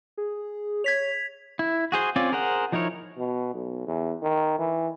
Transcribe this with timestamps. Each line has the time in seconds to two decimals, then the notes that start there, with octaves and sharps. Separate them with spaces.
0.18 G#4
0.84 C#5 G#6 B6 F7
1.59 E4
1.92 F#4 G#4 C5
2.16 C4 C#4 F4 D5
2.32 G#4 A#4 C5 F#5
2.72 F3 D#4 E4 A#4 C#5
3.18 B2
3.54 B1
3.87 E2
4.22 D#3
4.58 E3